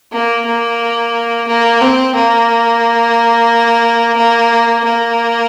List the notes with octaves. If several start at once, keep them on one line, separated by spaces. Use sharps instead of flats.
A#3
A#3
A#3
C4
A#3
A#3
A#3